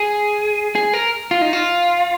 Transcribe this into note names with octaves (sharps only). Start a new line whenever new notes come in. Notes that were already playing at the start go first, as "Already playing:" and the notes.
Already playing: G#4
G#4
A#4
F4
D#4
F4